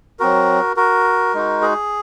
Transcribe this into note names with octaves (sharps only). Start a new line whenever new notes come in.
F#3 C4 F#4 A#4
F#4 A#4
G#3 D#4 F#4
G#4